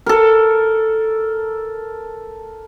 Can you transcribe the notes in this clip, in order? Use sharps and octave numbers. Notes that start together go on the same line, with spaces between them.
A4 A#4